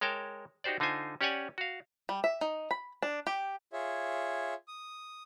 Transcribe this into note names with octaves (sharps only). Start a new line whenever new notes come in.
G#3 A#4 C#5 G5 A5
D#4 F#4 G4 C5 D5
D3 D#4 F4 C5 G#5
C#4 G4 C#5 D5 F#5 G#5
F#4 F5
G3
E5
D#4
B5
D4
G4
F4 G#4 C#5 E5
D#6